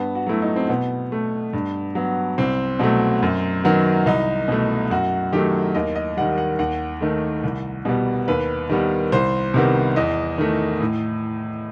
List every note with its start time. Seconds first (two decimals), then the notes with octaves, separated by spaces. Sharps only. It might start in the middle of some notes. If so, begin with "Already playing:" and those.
Already playing: G2 B3
0.15 F#4
0.27 F#3 A3 E4
0.42 D#4
0.56 C4
0.69 B2 B3
1.12 A3
1.53 G2
1.95 F#3 B3
2.38 C2 C4
2.79 B2 F#3 A3
3.23 F#2
3.64 D#3 F#3 B3
4.06 C2 D#4
4.48 B2 A3
4.90 F#2 F#4
5.32 D#3 F#3 A3 G4
5.75 D#2 D#5
5.96 D#5
6.17 D#3 G3 F#5
6.38 F#5
6.59 D#2 F#5
7.01 D#3 A3
7.43 C2
7.85 B2 G3 B3
8.28 D#2 B4
8.69 D#3 G3 B3
9.12 C2 C5
9.54 C3 D#3 G3 B3
9.96 E2 D#5
10.38 D#3 A3
10.80 A2